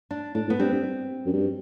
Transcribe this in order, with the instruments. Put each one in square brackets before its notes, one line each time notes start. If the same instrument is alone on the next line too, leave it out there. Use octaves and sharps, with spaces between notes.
[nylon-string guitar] D4
[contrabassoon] A2 [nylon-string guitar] D4
[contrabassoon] A2 [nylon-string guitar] B3
[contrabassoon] G2 [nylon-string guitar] C4
[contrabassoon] G2
F#2
G2